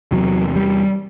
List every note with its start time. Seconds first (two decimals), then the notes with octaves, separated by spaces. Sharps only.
0.11 E2 C3 F#3
0.56 G3